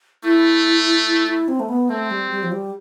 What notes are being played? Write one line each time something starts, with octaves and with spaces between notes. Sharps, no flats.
A3 E4
E4
E4
C4
A3
B3
A3 C4
G3
G3
F3
G3